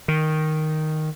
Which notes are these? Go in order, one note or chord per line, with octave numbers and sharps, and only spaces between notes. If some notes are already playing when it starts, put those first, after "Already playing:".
D#3